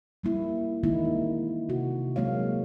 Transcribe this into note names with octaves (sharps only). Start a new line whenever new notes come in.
G3 A#3 E4
D#3 E3 G#3 A#3 D#4 E4
C4
C3 F#4
F#3 G#3 A#3 C4 C#5 F5